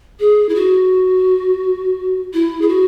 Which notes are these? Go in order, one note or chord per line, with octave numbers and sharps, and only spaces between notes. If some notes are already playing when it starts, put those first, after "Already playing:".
G#4
E4
F#4
E4
G#4
F#4